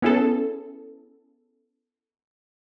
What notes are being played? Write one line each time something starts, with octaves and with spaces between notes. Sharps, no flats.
B3 C#4 E4 G#4 A4